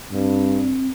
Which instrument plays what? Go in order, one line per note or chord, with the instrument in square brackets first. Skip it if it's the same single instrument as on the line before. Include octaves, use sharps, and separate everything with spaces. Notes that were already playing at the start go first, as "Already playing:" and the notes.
[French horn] G2 [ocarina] C4